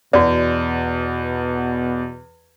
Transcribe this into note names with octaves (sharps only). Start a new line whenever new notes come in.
E2 B2 F#4 D5